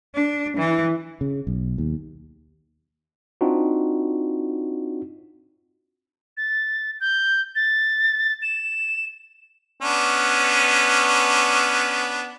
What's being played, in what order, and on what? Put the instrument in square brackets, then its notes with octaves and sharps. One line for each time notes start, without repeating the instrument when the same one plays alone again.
[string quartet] D4
E3
[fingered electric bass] C#3
B1
D#2
[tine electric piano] C4 D4 D#4 F4 F#4
[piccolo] A6
G6
A6
E7
[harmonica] B3 C#4 D4